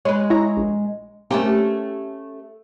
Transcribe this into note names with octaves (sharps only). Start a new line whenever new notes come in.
G#3 B4 C#5
E4 C#5 A#5
A#1
A3 A#3 C4 C#4 G4